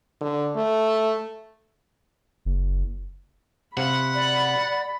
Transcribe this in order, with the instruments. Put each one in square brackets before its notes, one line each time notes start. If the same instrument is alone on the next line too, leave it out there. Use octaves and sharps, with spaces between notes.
[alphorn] D3
A3
[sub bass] F#1
[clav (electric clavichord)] C3 F5 [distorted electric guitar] F#5 [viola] B5
[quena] D5